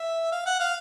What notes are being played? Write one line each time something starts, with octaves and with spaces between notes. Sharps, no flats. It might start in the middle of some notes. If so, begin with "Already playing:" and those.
Already playing: E5
F5
F#5
F5